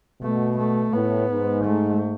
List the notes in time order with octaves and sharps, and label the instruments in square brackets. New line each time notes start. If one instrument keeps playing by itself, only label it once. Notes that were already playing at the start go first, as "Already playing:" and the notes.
[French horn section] B2 [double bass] A3
[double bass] A3
[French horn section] A2 [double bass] B3
[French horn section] G#2
[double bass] A3